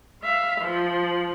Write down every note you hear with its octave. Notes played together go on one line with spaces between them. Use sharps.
E5 F5
F3